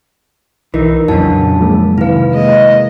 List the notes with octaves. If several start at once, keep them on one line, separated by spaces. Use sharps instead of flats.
B1 E3 D#4 A#4
F2 A#2 C#3 F#3 D4 A5
F3 G#3 A#3
C3 D#3 E4 B4 F5
G#3 A#3 D#5